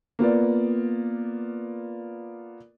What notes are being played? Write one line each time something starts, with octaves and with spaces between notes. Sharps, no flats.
A#3 B3 F4 D5